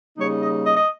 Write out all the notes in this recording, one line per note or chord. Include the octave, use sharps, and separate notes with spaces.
C#3 G3 A#3 D#4 C#5
D#5
D#5
D#5